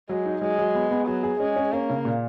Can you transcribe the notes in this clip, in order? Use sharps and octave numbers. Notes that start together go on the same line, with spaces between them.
F#3 G#3
D#4
F#3 G#3
F#3
B3
B3
F#3 G#4
G#4
G#3 C#4
C#4
A#3 C#4
C#3
A#2